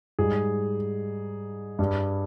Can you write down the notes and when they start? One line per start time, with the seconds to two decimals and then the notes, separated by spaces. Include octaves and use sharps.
0.19 G#2 G3 G#4
1.79 G2 G3